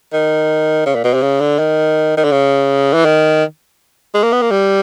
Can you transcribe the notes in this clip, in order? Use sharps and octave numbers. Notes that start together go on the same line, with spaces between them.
D#3
C#3
A#2
B2
C3
C#3
D3
D#3
D#3
D3
C#3
E3
D#3
G#3
A#3
B3
A#3
G3